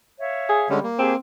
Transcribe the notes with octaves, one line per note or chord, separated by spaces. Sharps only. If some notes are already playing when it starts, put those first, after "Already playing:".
C#5 E5 F5
G#4
D3 G3 G#3 C#4
A#3
C4 G4 G#4 A5